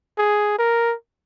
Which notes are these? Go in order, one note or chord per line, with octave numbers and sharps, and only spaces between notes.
G#4
A#4